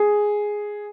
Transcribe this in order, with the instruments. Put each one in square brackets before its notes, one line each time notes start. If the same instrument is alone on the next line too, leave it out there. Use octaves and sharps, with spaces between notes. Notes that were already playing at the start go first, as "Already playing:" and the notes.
Already playing: [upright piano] G#4